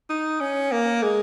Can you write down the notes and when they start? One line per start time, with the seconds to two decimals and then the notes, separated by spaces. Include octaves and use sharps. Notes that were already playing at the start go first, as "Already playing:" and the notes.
0.10 D#4
0.41 C#4
0.72 A#3
1.03 G#3